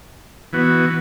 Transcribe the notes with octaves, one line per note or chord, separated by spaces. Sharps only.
E3 B3 F#4